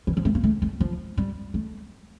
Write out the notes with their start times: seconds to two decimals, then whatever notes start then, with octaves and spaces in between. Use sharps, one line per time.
0.07 E3
0.17 F3
0.25 A3
0.35 A#3
0.44 A3
0.62 A3
0.80 F3
1.17 G3
1.54 A3